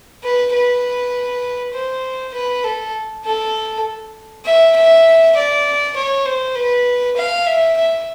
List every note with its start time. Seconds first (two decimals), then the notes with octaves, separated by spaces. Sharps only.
0.24 B4
0.54 B4
1.74 C5
2.34 B4
2.64 A4
3.25 A4
4.45 E5
4.76 E5
5.36 D5
5.96 C#5
6.26 C5
6.56 B4
7.17 F5
7.46 E5
7.77 E5